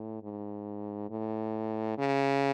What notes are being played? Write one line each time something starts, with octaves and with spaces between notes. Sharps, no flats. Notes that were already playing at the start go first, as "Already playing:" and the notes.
Already playing: A2
G#2
A2
C#3